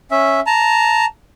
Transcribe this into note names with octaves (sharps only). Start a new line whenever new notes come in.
C#4 E5
A5 A#5